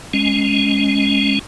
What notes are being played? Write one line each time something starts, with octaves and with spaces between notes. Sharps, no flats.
G#3 C#4